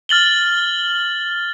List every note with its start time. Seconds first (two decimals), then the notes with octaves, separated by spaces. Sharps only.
0.09 F6 A6 F#7 G7